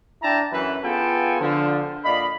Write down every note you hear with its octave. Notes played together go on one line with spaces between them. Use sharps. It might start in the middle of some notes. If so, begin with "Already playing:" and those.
D4 E4 G5 A5 A#5
F#2 E3 B4
B3 F4 G#4 A4 G5 G#5
D3 F3
A#2 D5 D#5 F5 B5